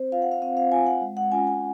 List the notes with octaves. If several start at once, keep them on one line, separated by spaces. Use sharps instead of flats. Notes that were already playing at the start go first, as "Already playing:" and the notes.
Already playing: C4 C5
F4 F5
F#5
F5
C4 F5
F5
F4 G#5
F#5
G#3
F#5
C#4 F4 G#5
G#5